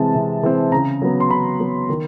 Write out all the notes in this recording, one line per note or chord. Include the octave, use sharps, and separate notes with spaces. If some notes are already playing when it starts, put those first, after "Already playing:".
Already playing: C3 E3 G#3 C4 A5
C3
E3 G#3 C4
C#3 A#5
F#3 B3
C6
C#3 B5
F#3 B3
D#3